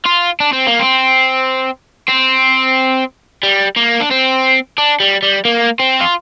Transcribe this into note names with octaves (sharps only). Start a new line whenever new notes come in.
F4
D4
C4
A#3
C4
C4
G3
A#3
D4
C4
D4
G3
G3
A#3
C4
F4